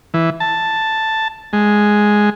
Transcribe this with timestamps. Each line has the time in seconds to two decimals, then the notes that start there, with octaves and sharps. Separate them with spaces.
0.14 E3
0.40 A5
1.53 G#3